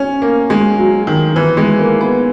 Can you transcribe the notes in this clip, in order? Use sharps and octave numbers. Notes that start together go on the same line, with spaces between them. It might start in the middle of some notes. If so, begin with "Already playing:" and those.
Already playing: C#4
A#3
G#3
F#3
D#3
E3
G#3
A#3
B3